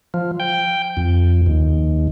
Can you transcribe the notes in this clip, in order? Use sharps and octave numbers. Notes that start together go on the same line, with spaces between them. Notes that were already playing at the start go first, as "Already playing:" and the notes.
F3
G5
F2
D#2